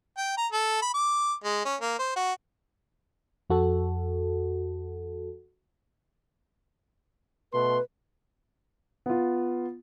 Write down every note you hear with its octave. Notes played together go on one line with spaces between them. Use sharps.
G5
A#5
A4
B5
D6
G#3
C#4
A#3
C5
F#4
F2 F#4 A4
B2 A3 B4 C6
B3 F4